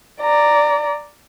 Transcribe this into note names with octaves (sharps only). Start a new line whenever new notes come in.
D5 A#5